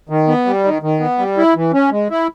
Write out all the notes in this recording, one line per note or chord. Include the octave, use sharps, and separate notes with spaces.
D#3
B3
G3
D#3
D#3
B3
G3
E4
E3
C#4
G#3
E4